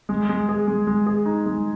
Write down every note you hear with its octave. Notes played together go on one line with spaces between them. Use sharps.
G#3
G#3
G#4
G#3
G#3
G#4
D#4
G#3